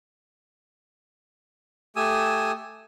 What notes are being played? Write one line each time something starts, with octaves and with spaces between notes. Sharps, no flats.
A3 G4 G#5 D#6 E6